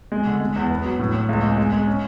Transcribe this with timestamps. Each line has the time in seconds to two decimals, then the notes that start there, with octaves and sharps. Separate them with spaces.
0.12 G#3
0.27 D3
0.41 G#3
0.56 E2
0.71 B3
0.85 F#3
0.99 A2
1.14 A2
1.29 C#2
1.43 G#3
1.58 G#3
1.73 G#3
1.87 C#4